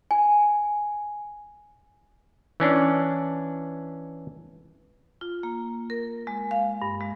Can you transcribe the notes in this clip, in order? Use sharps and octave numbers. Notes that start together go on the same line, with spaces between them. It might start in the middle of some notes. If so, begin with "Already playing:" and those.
G#5
E3 C#4 D4
F4
A#3
A#4
G#3
F5
G2
G#3